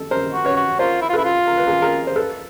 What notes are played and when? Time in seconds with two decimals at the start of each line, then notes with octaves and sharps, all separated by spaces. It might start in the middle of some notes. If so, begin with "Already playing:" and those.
Already playing: A4
0.11 A#4 C5
0.33 F#4
0.45 B4 C#5
0.56 F#4
0.79 F4 A#4 C5
1.02 E4
1.09 F4
1.13 E4 A4 B4
1.24 F4
1.48 A#4
1.57 B4
1.67 G#4 A#4
1.82 G#4 A#4
2.07 C5
2.16 A4 B4